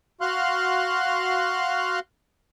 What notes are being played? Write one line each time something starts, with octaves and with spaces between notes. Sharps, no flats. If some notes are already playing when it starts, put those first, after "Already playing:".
F#4 F5 C6 F6 F#6